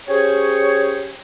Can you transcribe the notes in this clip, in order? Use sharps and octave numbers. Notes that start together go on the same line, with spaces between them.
C#4 G4 G#4 C5 C#5